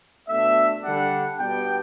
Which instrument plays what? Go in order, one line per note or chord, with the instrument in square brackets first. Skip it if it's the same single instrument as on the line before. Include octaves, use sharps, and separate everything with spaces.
[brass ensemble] B2 A3 D4 E5
D3 G3 D4 F#5
B2 G3 B3 D4 G5